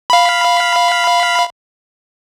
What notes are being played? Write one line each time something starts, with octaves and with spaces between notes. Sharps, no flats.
F5 B5